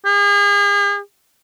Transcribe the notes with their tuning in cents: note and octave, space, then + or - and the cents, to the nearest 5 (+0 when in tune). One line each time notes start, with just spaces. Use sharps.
G#4 -40